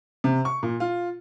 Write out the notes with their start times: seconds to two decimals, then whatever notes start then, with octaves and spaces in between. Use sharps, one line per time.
0.24 C3
0.45 C#6
0.63 A#2
0.80 F4